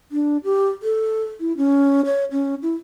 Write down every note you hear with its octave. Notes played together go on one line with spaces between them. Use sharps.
D4
G4
A4
E4
C#4
C#5
C#4
E4